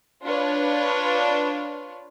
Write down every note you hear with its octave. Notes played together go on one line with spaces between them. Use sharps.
D4 F4 B4 C#5